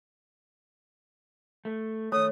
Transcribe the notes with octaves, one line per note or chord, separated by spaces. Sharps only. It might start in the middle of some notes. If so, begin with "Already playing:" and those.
A3
D#3 A3 C#5 D#6